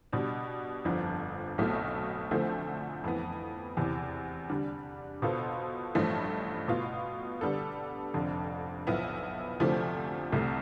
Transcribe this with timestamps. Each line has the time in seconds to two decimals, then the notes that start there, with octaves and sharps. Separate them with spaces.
0.13 B2 G3 D4
0.85 G1 F2 D3 F3
1.58 B1 B2 A3 C4
2.31 D2 D3 F3 A3 C4
3.04 F2 E3 B3
3.77 E2 C3 E3
4.49 D3 G3 D4
5.22 B2 B3 F4 A4 C5
5.95 A1 G2 F3 A3
6.68 B2 B3 F4
7.41 D3 G3 B3 D4 A4
8.14 F1 F2 D3
8.87 B1 A2 F3 B3 E4
9.60 D2 C3 F3 A3 D4
10.32 C2 C3 E3 A3 E4